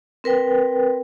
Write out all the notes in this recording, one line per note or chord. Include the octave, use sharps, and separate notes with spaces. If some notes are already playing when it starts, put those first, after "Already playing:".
C4 A#4 B4 G5